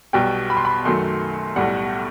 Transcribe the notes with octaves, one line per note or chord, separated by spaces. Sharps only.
B1 B2 G3 G5
B5
C6
B5
F#2 D#3 F#3 A3 C6
B1 A2 G3 F#5